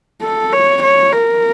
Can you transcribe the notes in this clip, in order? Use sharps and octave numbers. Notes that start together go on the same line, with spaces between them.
A4
C#5
C#5
A#4